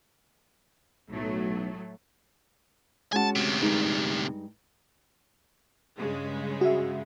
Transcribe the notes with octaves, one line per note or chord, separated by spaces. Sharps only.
B1 A2 F#3 A3
G#3 C#4 F#4 G#5 A5
D2 C3
G2 G#3 D#4
G2 C#3 G#3
F#4 E5